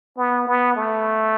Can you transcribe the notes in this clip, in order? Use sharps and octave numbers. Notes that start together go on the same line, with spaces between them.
B3
B3
A3